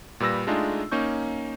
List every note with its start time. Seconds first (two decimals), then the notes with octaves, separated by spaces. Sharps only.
0.20 A#2 G3 B4 E6 A#6
0.47 G#3 A3 D4 D#4 F4 G#4
0.92 A#3 C#4 D#4 C#6 G6